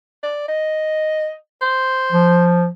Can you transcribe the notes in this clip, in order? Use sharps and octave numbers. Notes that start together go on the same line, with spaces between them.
D5
D#5
C5
F3